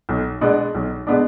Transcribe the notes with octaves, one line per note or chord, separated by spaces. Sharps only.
B1
B2 G#3 B3 D4
B1
B2 G#3 B3 D4